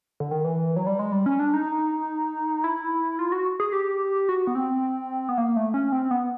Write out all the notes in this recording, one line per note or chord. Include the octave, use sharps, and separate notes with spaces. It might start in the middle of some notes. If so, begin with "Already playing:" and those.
D3
D#3
E3
F#3
G3
G#3
G3
C#4
D4
D#4
E4
F4
F#4
G#4
G4
F#4
B3
C4
B3
A#3
A3
C#4
C4
B3